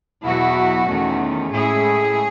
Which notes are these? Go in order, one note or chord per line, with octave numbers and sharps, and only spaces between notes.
E2 B2 F#3 B3 E4 F#4
E2 D#3 A3 C#4
A2 G#3 C#4 E4 G#4